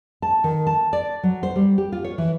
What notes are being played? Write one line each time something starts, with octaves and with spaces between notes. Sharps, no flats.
A5
D#3
A5
D5
F#3
C5
G3
G4
F4
C#5
E3